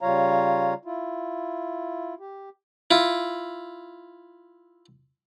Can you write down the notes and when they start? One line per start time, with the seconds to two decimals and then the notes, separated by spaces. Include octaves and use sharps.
0.01 C#3 G3 F4 C#5 F5 A#5
0.85 E4 F4
2.20 G4
2.91 E4 F4